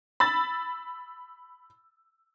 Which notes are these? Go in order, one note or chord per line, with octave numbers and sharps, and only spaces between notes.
B5 E6 A6